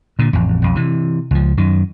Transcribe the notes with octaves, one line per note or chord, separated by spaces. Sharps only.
A#2 D3
A1 F2
B1 F2
C3 E3
C#2 F3
F#2 D#3